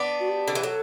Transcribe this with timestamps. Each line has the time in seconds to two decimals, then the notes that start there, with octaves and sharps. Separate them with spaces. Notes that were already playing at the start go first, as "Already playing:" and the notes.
Already playing: B3 D4
0.20 F#4
0.28 G4
0.48 D3
0.55 E3
0.63 F#3 A4